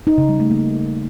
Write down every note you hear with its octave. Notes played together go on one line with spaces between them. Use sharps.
D#4
C#3
G3
A3
A#3